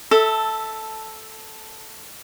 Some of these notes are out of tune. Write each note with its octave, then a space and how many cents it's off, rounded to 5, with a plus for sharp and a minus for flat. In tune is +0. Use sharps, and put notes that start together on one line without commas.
A4 +0 E5 -15